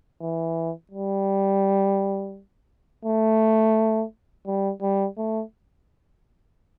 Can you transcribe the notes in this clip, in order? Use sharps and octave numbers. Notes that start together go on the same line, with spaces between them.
E3
G3
A3
G3
G3
A3